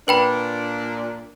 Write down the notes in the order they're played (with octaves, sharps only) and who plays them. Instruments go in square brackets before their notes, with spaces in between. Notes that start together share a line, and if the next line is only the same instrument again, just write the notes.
[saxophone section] A#2 D4 [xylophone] B4 G5 B5